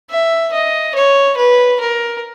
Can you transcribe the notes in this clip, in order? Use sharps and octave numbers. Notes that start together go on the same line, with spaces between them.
E5
D#5
C#5
B4
A#4